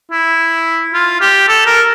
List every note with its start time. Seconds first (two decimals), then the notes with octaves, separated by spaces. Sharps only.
0.11 E4
0.94 F4
1.21 G4
1.48 A4
1.66 A#4